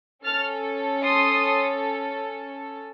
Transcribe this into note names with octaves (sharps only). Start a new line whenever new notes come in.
C#4 A4 F6 A6
C6 D#6